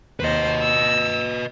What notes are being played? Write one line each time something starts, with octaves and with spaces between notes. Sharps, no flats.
D#2 B4 C5 D#5
E6